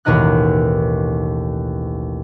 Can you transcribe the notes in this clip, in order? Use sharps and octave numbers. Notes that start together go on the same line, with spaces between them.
A1 D#2 B2 D#4 D#5 F#6